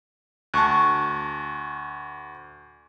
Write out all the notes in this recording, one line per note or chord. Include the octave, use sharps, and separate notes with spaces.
D2 A5 C#6 F#6